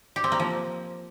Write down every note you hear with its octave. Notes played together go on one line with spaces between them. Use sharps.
G4
C4
A#3
F3